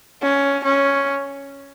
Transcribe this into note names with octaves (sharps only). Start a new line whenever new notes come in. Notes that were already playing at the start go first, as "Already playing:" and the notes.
C#4
C#4